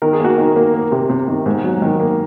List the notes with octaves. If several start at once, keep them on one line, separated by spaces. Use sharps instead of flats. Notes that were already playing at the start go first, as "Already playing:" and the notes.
D#3 A#4
G#4
A#3 F#4 A#4
D#3
A#3
A#3
C3
C3
D#3
G#2
F#3
D#3
A#3